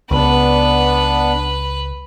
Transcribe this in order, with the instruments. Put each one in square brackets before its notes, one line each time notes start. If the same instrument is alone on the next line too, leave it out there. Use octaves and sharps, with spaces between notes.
[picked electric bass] C#2 [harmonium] B3 D4 [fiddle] B4